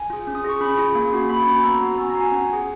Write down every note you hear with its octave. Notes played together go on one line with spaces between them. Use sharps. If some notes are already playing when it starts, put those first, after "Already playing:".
Already playing: G#5
F4 G#4
C#4
D#6
F4 G#4 C#6
C#4 B5
F4 G#4
A#3
C#4 F#4
A#3 B5
C#4 F#4
B3 A#5
F#4
B3 G#5
A#5
F#4
G#5
C#4 F#5
F4 G#4